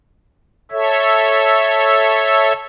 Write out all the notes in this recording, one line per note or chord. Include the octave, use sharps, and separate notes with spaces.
A4 C#5 E5